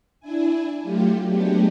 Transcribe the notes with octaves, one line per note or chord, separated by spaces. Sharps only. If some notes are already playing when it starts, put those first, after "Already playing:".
D4 E4 G#5
F#3 A3 F4 G4
F#3 G#3 A3 B3 D4 G4